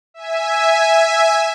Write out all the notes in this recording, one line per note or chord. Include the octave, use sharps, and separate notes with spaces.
E5 G#5